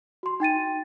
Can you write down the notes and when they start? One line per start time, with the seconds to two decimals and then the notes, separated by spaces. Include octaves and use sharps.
0.23 F#4 C6
0.40 D#4 G5 A6 D#7